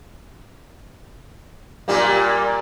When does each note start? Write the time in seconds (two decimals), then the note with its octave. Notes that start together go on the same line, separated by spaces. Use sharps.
1.88 A#2 G3 A#3